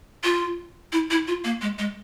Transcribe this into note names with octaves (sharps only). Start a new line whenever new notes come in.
F4
E4
E4
F4
A#3
G#3
G#3